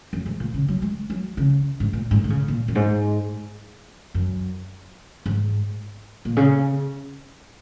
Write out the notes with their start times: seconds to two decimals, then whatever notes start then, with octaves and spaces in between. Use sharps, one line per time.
0.13 F#2
0.26 G#2
0.40 A#2
0.54 C#3
0.68 F#3
0.82 G#3
1.10 F#3
1.37 C#3
1.80 G#2
1.93 A#2
2.11 G#2
2.24 D#3
2.30 C#3
2.48 A#2
2.68 F#2
2.75 G#2
4.14 F#2
5.26 G#2
6.25 A#2
6.37 C#3